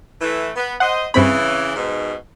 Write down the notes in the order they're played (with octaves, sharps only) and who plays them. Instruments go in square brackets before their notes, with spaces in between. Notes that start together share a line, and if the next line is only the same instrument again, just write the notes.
[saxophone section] E3 A3
B3
[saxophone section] C5 D#5 [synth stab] F#5
[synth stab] G2 C4 B5 [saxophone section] C#3 E3
[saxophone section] G#2 B2